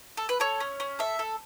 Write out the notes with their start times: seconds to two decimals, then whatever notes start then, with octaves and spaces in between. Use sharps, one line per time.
0.17 A4
0.29 B4
0.40 A4 C#5
0.60 C#4
0.80 C#4
0.99 A4 E5
1.19 A4